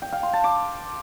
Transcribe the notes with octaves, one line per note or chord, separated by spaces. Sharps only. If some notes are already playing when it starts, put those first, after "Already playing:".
G5
F5
C6
A5
D6